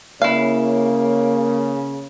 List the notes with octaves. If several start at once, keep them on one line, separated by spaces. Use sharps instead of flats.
C#3 A#3 E4 C#5 F5